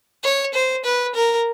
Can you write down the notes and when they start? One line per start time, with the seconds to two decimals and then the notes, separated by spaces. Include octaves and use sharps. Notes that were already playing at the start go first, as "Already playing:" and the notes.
0.24 C#5
0.54 C5
0.85 B4
1.15 A#4